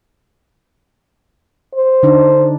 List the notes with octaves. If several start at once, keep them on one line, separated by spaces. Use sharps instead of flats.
C5
D3 D4 D#4